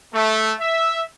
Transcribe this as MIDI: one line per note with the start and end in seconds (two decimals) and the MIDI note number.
0.13 0.52 57
0.59 1.01 76